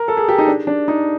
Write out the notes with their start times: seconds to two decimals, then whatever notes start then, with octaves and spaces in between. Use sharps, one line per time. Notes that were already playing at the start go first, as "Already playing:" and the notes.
Already playing: A#4
0.08 A4
0.17 G#4
0.28 G4
0.38 D#4
0.47 D4
0.67 D4
0.88 D#4